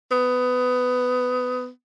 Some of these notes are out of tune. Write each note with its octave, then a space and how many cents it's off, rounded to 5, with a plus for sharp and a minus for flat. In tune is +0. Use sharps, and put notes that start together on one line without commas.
B3 +20